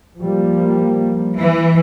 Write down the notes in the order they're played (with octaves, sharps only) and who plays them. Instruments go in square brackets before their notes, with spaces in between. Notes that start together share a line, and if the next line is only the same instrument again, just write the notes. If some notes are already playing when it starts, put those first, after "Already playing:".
[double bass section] F3 G3 A#3
[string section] E3